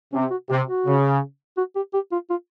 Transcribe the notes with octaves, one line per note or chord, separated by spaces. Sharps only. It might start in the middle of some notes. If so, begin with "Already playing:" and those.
C3 C#4
F#4
C3 G4
F#4
C#3
F#4
G4
G4
F4
F4